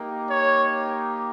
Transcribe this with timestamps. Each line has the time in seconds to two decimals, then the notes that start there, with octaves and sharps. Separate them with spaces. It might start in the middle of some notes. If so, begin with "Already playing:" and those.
Already playing: A#3 D#4 G4
0.28 C#5